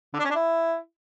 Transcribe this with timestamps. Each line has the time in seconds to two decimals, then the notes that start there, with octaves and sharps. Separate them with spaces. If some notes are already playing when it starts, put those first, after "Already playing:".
0.14 D3
0.19 D4
0.24 C#4
0.30 D4
0.35 E4